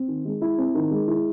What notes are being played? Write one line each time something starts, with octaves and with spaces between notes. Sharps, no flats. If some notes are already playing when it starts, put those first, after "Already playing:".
Already playing: C4
D#3
G#3
E4
C4
D#3
G#3
E4